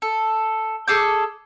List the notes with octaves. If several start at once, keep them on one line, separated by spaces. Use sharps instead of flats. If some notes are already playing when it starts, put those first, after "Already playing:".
A4
G#4 A4 D6 G6